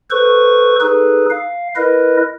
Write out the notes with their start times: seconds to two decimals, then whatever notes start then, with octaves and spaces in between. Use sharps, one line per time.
0.11 A4 B4 C5 C#6
0.81 D#4 G#4 A4 B4
1.30 F5
1.76 E4 A#4 B4 D#5